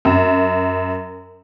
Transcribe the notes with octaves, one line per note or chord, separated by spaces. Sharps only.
F#2